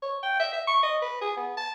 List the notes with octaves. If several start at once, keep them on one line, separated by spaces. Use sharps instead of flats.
C#5
G5
E5
E5
C#6
D#5
B4
G#4
B3
A5